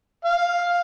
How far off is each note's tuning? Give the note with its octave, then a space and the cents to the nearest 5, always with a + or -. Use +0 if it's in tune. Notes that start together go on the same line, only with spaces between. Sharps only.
F5 +5